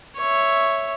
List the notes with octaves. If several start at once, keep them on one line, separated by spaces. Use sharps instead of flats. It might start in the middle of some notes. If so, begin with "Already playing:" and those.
C#5 E5